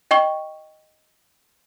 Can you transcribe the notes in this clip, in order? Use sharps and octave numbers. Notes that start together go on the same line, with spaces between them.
D#5 G5 C#6 G7